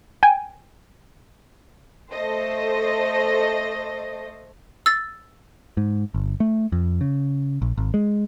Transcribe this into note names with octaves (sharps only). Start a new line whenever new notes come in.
G5 G#5
A3 A4 C5 D#5
E6 A6
G#2
G1
A3
F2
C#3
A#1
G#1
G#3